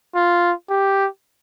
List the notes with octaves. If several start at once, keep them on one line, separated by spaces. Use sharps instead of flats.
F4
G4